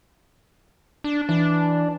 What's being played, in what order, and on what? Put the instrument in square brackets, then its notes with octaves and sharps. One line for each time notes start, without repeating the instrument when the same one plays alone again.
[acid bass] D4
[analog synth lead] E3 [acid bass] D4